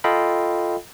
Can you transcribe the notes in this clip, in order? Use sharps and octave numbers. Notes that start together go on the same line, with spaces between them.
F4 A4 D#5 F5 G5 B5